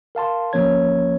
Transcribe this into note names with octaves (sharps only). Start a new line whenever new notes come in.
A#4 F5 A5 C6
A1 F3 A#3 C#4 C#5 G#6